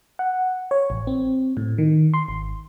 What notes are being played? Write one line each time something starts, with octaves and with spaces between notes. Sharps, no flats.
F#5
C#5
A1
C4
A2
D#3
C6
G#1